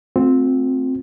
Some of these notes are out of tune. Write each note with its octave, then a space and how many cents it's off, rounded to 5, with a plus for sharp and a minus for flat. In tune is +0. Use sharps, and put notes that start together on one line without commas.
A3 +0 C4 +0 F4 +40